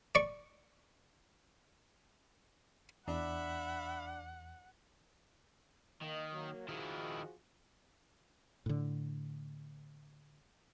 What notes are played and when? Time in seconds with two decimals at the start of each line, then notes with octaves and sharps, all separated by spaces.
0.15 D5 C#6
3.08 E2 D4 E5 F#5 B5
6.02 D#3 A#3 D#5
6.32 F#3 A#3
6.69 D#3 F3 E4 F#4 G#4
8.66 A2 D3